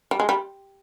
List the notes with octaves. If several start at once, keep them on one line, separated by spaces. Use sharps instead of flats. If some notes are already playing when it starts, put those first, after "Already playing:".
G3
G#3
G3